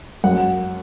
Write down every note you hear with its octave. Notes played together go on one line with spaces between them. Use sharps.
F#2 F#5